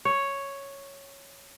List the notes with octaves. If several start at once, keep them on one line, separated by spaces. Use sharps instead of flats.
C#5